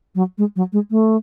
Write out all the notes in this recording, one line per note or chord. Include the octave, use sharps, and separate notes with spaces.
F#3
G#3
F#3
G#3
A3